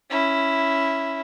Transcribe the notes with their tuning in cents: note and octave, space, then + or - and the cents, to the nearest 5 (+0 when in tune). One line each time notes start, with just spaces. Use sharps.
C#4 +0 E4 +0